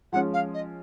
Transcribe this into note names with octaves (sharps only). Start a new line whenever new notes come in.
F3 G#3 C#4 F4 F#5
F5
D#5